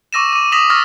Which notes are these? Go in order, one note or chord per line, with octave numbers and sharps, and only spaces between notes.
C#6 D6 E6 A#6 D#7 E7
D6 D#7
D6 D#6 A#6 B6 E7 F#7
C#6 E6 F6 A6 A#6